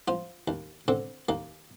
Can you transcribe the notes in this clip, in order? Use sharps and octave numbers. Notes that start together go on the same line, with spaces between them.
F3 F4
D#2
D3 C4
D#2 A#3